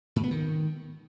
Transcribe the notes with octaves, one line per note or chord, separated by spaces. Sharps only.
G#2
B3
D#3